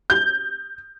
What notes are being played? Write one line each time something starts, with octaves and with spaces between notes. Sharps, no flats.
G6